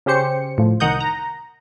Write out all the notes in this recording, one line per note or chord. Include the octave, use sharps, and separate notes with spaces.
C#3 C#4 G4 C5 C#7
A2 F3
C2 D#3 F#5 A#5 D#6 G6
A#5